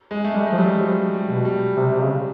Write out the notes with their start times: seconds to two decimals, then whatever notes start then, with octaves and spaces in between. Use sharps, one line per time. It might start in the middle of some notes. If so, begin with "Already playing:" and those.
0.11 G#3
0.25 A3
0.34 G3 G#3
0.47 G#3
0.52 F3
0.58 F#3 G3
0.82 F3 F#3
1.14 G3
1.29 B2
1.45 G3
1.77 C3
1.90 C3
2.01 C#3